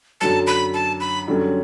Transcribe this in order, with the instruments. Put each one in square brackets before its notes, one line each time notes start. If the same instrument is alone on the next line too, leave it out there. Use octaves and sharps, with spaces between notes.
[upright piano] F#2 D3 F#3 [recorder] A5
[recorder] B5
A5
B5
[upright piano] F#2 D3 G3 C#4